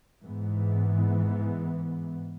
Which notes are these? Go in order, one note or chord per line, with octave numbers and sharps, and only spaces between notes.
G#2 E3 B3